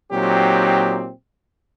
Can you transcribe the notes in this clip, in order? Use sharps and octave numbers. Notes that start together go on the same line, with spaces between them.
A#2 F#3 C4 D#4 G4